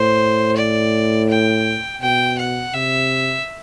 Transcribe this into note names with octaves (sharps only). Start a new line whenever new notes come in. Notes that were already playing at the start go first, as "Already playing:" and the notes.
Already playing: A2 C5
D5
G5
B2 G5
F#5
C3 E5